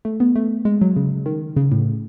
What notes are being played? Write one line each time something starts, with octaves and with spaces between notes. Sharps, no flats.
A3
B3
A3
G#3
F#3
C#3
D#3
C#3
A2